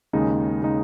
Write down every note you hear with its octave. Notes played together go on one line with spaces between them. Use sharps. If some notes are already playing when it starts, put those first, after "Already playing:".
D#2 C#3 G#3 D#4
C#3 G#3 D#4